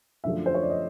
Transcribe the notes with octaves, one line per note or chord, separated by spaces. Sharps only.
F#2 D3 F3 A3 E5
C5
C#5
D5
D#5